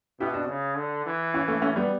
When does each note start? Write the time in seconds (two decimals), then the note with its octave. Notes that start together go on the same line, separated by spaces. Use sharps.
0.20 B2 E4 G4
0.34 D4 F#4
0.48 C#3
0.77 D3
1.06 E3
1.34 C#4 E4
1.48 A3 C#4
1.62 A3 C#4
1.76 G3 B3